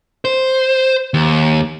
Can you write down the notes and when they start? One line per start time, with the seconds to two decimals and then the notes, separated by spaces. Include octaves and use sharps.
0.25 C5
1.14 D#2